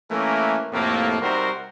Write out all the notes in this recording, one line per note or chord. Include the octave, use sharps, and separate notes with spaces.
E3 A3 A#3 C#4 A#4
F2 A2 C3 A3 A#3
C3 G3 D#4 F#4 A#4 C5